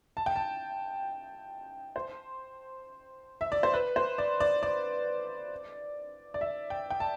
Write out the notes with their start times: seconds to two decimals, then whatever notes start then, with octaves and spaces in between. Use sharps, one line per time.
0.17 A5
0.26 G5
0.36 A5
1.96 C5
3.41 E5
3.52 D5
3.63 C5
3.74 B4
3.96 C5
4.18 D5
4.40 D5
4.63 D5
6.34 D5
6.41 E5
6.70 G5
6.90 G5
7.00 A5